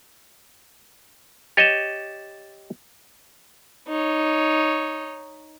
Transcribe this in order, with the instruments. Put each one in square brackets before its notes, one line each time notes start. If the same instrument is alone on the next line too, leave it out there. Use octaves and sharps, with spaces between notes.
[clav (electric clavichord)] G4 C#5 D#5 [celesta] A6 E7
[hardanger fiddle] D#4 C#5